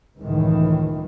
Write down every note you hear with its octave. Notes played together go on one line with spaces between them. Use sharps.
C#2 F#2 A2 D#3 E3